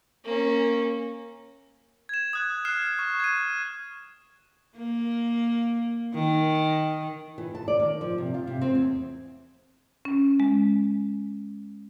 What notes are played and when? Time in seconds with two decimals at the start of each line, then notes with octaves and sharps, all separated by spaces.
0.24 A#3 C#4
2.09 G#6 E7
2.33 D#6 F#6 G#6
2.65 F6 F#6 C7 E7
2.99 C#6
3.20 G#6 D#7
4.78 A#3
6.13 D#3
7.38 E3
7.55 A5
7.68 D5
7.80 D#3
8.01 F3
8.18 C3
8.34 F4
8.47 C3
8.61 C4
8.75 E2
10.05 C#4
10.40 G#3